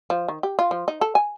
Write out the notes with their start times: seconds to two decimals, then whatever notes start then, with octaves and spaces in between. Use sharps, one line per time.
0.10 F3
0.28 D#3
0.43 G4
0.59 F4
0.71 F3
0.88 D#4
1.01 A4
1.15 G#5